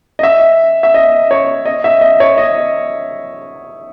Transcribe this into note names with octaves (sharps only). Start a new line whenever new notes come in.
D#5
E5
E5
D#5
C#5
D#5
E5
D#5
C#5
D#5